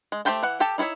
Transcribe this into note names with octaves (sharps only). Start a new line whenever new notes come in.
G#3
A3 G4 C5 G5 A5
E3 F#5
G4 A4 G5 A5
D#4 E4 A4 C#5 E5